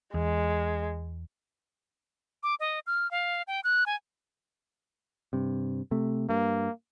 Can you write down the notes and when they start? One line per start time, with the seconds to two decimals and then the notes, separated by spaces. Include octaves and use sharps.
0.14 E2 G#3
2.43 D6
2.60 D#5
2.87 F6
3.11 F5
3.48 G5
3.64 F#6
3.86 G#5
5.33 G2 C3
5.91 C3 A3
6.29 G2 A#3